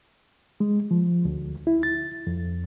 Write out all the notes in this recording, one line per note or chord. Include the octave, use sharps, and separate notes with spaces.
G#3
F3
D2
E4
A6
F2